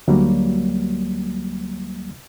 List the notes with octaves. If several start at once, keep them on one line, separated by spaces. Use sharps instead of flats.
D2 F#3 G3 A#3